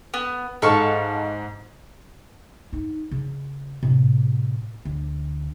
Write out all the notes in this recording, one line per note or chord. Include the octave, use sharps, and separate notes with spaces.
B3
G#2 A4 F5 C#6
D#4
C#3
A2 C3
D2